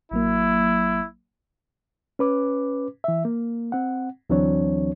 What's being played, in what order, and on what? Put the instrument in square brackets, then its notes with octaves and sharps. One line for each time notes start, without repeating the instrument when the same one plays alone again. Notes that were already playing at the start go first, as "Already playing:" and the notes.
[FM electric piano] A1 F#3 A#3 [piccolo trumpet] E4
[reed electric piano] C#4 B4 D6
E3 E5
A#3
C4 F#5
D2 E3 F#3 C4 D4 C#5